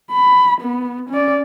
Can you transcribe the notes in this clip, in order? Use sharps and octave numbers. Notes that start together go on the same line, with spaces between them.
B5
B3
C#4 D5